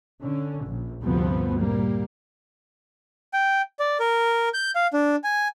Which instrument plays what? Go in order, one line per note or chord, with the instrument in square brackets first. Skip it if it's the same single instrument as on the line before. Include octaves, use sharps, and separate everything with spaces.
[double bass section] D3 C#4
A#1
D2 G2 C3 F3 B3 C4
A#2 G3 A#3
[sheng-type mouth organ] G5
D5
A#4
G6
F5
D4
G#5